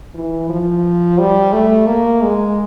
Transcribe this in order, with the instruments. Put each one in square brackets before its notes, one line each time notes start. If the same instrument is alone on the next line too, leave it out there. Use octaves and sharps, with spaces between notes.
[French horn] E3
F3
G3
A3
A#3
G#3